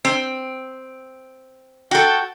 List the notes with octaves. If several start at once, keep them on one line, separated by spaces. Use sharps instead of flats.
C4
F#4 A4 G5